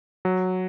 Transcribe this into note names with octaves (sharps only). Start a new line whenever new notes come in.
F#3